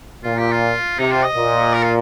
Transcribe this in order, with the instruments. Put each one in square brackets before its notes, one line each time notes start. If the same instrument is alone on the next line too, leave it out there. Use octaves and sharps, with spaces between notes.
[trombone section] A#2 [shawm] F4
[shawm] G4
F4
[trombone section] C3 [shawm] D#4
[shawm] F4
D#5
[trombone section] A#2
[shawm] A#4
F4